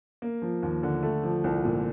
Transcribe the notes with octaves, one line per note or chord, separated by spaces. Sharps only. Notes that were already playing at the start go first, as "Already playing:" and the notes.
A#3
F3
D#2
D3
A3
F3
C2
A#2